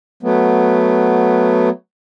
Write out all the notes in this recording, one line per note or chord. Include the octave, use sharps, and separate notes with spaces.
F#3 A3 B3